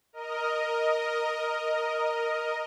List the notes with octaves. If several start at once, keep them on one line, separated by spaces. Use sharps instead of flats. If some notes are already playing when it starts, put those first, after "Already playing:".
A#4 D#5